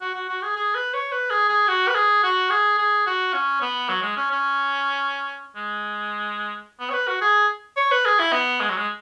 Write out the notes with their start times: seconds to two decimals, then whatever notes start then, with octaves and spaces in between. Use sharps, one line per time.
0.01 F#4
0.14 F#4
0.29 F#4
0.42 G#4
0.56 G#4
0.75 B4
0.94 C#5
1.12 B4
1.30 G#4
1.49 G#4
1.68 F#4
1.88 B4
1.95 G#4
2.23 F#4
2.50 G#4
2.78 G#4
3.06 F#4
3.34 C#4
3.61 B3
3.89 F#3
4.02 G#3
4.16 C#4
4.31 C#4
5.56 G#3
6.80 B3
6.90 C#5
6.94 B4
7.07 F#4
7.21 G#4
7.77 C#5
7.91 B4
8.06 G#4
8.19 E4
8.32 B3
8.60 G#3
8.69 F#3
8.77 G#3